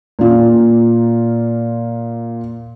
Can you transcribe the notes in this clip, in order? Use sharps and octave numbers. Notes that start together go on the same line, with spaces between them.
A#2 F4